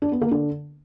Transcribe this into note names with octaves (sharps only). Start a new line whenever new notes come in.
D4
B3
A#3
D3